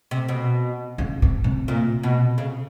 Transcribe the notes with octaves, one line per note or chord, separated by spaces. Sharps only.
C3
B2
C#3
C3
C3
A#2
B2
C#3